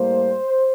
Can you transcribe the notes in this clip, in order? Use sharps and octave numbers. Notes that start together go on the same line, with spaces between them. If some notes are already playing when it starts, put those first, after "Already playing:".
Already playing: A2 G3 A#3 C5